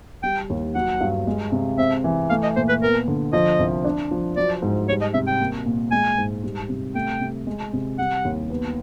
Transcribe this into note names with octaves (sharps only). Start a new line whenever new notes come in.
G3 G5
D#2
F#3 F#5
G2
G#3
C3
C4 E5
E3
A3 F5
D#5
A#2 C5
B4
B3 A#4
D3
F3 D#5
C2
D4
F3
F#3 D5
G#2
G3 C#5
D#5
C3 E5
G5
A#3
A#2
G#3 G#5
G#2
G3
C3
A3 G5
C3
G#3
C3
G3 F#5
D#2
B3